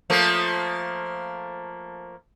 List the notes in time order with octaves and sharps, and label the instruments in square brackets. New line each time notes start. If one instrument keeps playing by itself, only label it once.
[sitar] F3 A3 A#3